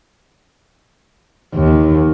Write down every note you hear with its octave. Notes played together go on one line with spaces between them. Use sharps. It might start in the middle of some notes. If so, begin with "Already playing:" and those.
D#2